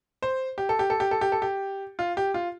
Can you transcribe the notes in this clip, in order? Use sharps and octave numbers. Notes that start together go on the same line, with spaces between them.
C5
G4
A4
G4
A4
G4
A4
G4
A4
G4
F4
G4
F4